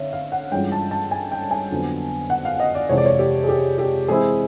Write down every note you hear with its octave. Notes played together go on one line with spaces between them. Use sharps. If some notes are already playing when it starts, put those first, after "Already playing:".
Already playing: D3 C4 C#5 E5 F5
F5
F#5
G2 E3 G#3 C#4 F4 G5
A5
A5
G#5
G5
G#5
F2 D3 F#3 B3
F#5
F5
D#5
D5
F2 C3 E3 G#3 C#5
D5
C#5
G4
G#4
G4
G4
E3 G#3 C4 E4 G#4